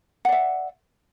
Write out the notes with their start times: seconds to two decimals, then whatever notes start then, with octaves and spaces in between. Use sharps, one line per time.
0.25 F#5
0.28 D5
0.32 E5